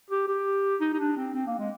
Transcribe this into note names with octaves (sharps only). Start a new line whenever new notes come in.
G4
G4
D#4
D#4
D4
C4
C4
A#3
G#3